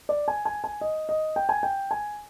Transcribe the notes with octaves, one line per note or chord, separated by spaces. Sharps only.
D5
G#5
G#5
G#5
D#5
D#5
G5
G#5
G5
G#5